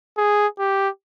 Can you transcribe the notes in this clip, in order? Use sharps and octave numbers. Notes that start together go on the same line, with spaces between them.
G#4
G4